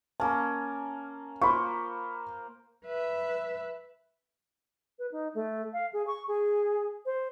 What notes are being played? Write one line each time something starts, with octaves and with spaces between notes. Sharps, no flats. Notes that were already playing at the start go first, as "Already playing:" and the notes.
A#3 C#4 A5
A#3 F4 C5 B5 C#6
B4 E5
B4
D#4
A3
F5
G#4
C#6
G#4
C5